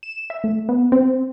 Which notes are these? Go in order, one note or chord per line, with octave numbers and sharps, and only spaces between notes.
E7
E5
A3
B3
C4